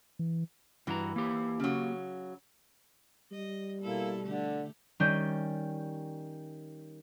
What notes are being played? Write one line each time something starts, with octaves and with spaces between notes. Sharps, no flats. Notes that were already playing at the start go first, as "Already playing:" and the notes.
E3
G2 E3 F#4 A#5
A#3 G4
C#3 F#3
G3 D#5
B2 A#3 E4 A4
D3 A3 G4
D#3 G3 C#4 G5 G6